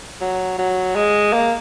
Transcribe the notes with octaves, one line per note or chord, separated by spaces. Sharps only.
F#3
F#3
G#3
A#3